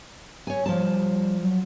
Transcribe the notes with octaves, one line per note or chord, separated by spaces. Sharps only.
C#5 G#5
F3 G3 A5
F#3